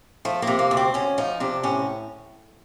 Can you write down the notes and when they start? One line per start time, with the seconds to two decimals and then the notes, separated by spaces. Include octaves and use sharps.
0.25 F3 A3
0.42 C3 A#3
0.59 A#3
0.71 D2
0.77 C4
0.94 D2 C#4
1.18 F3 D#4
1.40 C3 D4
1.63 A2 C#4